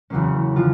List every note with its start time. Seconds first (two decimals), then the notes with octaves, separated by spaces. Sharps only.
0.10 E2 C#3 F#3 A#3 C#4
0.56 D3 F3 F4